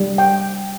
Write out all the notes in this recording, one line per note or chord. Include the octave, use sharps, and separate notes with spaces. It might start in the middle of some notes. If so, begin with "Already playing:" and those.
Already playing: G3
G5